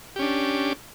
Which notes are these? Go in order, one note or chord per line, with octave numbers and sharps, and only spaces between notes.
C#4 D4 G4